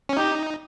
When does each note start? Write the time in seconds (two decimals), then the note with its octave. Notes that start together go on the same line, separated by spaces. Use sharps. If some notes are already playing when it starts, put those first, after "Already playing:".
0.09 C#4
0.17 D#4 G4